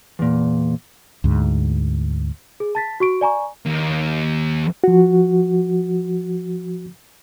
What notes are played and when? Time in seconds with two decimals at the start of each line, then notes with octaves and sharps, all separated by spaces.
0.19 E2 A#2
1.24 D2 G#2
2.60 G#4
2.75 A5 A6 B6
3.00 F#4 C#6 D7
3.21 D5 G#5 A#5 C#6
3.66 D#2
4.84 F3 F#4